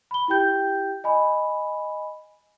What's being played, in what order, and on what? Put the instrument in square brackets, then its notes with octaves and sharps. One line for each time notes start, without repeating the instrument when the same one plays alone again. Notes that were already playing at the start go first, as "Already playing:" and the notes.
[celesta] B5 G7
E4 G4 G5 G6
D#5 G#5 B5